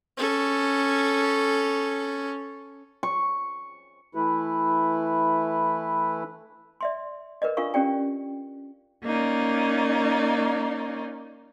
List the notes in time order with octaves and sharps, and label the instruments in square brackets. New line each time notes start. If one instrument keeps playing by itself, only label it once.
[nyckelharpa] C#4 A4
[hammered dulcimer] C#6
[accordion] E3 A3 E4 B4
[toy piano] D5 E5 C6
A#4 B4 D5 D#5
D4 F4 A4 A#4 F5 C#6
C#4 G4 D5 G5
[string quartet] A#3 C#4 D#4 D5